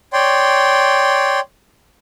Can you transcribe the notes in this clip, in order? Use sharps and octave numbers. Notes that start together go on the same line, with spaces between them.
C#5 D5 G5 C6